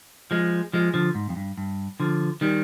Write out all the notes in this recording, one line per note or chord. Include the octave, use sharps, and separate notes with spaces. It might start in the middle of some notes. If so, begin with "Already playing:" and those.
F3 G#3
F3 G#3
D3 F3
G#2
F2
G2
G2
D3 F3
D#3 G3